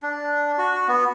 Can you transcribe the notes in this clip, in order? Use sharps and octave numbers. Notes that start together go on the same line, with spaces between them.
D4
F#4
B3